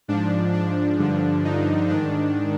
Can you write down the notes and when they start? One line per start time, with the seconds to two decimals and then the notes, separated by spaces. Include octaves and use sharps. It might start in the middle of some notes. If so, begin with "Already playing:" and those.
0.08 G#2 F3 D4
0.53 D4
0.99 G2 D3 F3
1.44 D#4
1.89 G#2 D#3 D4